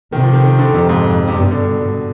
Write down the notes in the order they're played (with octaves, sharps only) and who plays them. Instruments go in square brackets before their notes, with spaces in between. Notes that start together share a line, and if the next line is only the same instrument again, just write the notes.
[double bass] C3 [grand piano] D#3
[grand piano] F3
D#3
D#3
D3
[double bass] F2 [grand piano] C3
[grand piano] G#2
C3
[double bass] G2 [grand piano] B2
[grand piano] D3